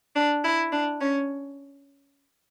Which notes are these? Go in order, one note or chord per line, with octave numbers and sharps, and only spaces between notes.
D4
E4
D4
C#4